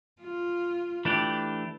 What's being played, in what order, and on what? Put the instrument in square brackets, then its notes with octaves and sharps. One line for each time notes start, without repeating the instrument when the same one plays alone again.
[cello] F4
[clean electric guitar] E3 A3 D4 G4